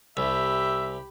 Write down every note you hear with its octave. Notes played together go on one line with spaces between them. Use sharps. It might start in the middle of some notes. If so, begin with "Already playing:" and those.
C2 G4 E5 B5